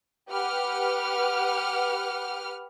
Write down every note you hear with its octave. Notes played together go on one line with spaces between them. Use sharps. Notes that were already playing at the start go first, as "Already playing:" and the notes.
G4 B4 F#5 F6